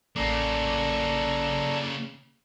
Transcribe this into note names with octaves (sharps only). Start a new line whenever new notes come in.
A1 C#3 A#3 A4 D5 A#5 D6